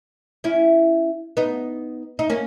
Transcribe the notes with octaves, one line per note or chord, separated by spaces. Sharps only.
C#4 E4
B3 D#4
D#4
A#3 C#4